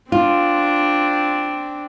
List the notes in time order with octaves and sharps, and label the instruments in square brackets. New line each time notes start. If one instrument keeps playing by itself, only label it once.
[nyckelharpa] C4 D4 [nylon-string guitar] F4